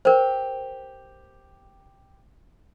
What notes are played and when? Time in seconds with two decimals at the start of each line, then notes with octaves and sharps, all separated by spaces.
0.05 G4 A#4 C5